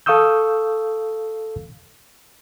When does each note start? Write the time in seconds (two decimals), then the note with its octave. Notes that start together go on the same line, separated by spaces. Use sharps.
0.06 A4 F5 C#6 D#6 E6 G6